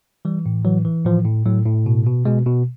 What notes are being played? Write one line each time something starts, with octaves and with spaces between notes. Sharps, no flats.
E3 G3
A2
E3 F#3
E3
A2 F3
A2
A2 F#3
A2
B2
B2
B2 G#3
B2